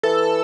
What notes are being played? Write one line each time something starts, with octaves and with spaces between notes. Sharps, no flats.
E3 A4